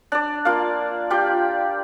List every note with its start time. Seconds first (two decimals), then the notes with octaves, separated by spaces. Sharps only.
0.12 D4 D5
0.45 A#3 F4 D5 F5
1.10 F4 G4 D5 G5